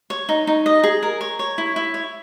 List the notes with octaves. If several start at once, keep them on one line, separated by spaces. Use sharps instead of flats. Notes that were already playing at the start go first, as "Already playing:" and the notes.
C#5
D#4
D#4
D#5
G#4
A#4
C#5
C#5
E4
E4
C#5